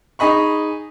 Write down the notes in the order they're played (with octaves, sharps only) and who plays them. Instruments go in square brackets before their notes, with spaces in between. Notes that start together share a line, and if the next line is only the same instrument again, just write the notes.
[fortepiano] D#4 G#4 D#5 B5 C#6